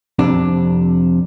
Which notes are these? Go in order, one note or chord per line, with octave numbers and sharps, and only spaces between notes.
F2 C3 D4